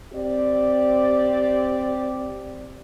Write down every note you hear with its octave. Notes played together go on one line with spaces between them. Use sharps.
C4 G4 D5